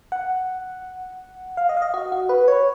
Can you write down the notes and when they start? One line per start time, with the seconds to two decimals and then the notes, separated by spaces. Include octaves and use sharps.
0.12 F#5
1.57 F5
1.69 D#5
1.77 F5
1.82 D#5
1.94 F#4
2.12 F#4
2.29 B4
2.48 C#5